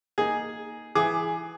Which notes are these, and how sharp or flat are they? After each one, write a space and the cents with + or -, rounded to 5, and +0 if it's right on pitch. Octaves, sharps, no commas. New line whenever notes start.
A#3 +0 D#4 +0 G#4 +0
E3 +15 G#4 +10 D6 +15